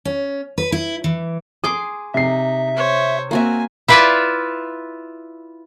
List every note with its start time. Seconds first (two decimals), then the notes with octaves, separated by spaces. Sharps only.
0.05 C#4
0.58 B4
0.72 E4
1.04 E3
1.64 G#4 C6 D6 D#6
2.14 C3 D#4 E5 C7
2.76 C5 C#5
3.31 A#3 C4 F#4 E5 G#5
3.88 E4 F4 B4 D5 E5